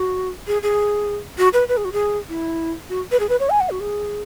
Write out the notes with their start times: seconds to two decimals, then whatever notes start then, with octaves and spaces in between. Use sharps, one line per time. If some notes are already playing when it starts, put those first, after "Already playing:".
Already playing: F#4
0.47 G#4
0.63 G#4
1.38 F#4
1.53 B4
1.68 B4
1.77 G#4
1.85 F#4
1.93 G#4
2.29 E4
2.89 F#4
3.11 B4
3.20 G#4
3.29 B4
3.40 C#5
3.50 G#5
3.60 F#5
3.70 F#4
3.80 G#4